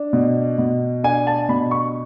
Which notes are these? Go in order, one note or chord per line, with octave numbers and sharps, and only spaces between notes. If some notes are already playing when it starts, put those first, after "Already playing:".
Already playing: D4
B2
B2
D4 G#5
A5
B2 B5
C#6